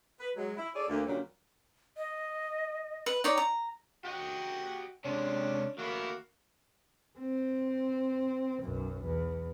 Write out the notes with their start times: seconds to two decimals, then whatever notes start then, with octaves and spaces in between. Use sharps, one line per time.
0.20 B4
0.36 F#3 G#3
0.57 E4
0.75 G#4 A4 C#5 D5
0.88 D2 A#3
1.06 F#2 A#2 D3 F#3 G3 C#4
1.97 D#5
3.06 B4
3.24 D#4 C#5 D5
3.37 A#5
4.05 F#4 G4 D#5 F#5 G5
5.05 C3 G#3 C#4 D4
5.78 D#3 A3 A#3 E4 F#4
7.18 C4
8.62 B1 F#2
9.04 E2